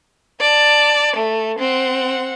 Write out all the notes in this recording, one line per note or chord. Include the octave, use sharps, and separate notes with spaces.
D5 A5
A3
C4 F#5